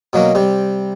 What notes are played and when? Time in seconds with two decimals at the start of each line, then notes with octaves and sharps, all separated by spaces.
0.13 B2 F#3 A#3 C#4
0.35 C3 G3